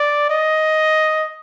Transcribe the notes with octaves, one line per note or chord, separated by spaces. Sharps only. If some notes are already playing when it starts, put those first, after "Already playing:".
Already playing: D5
D#5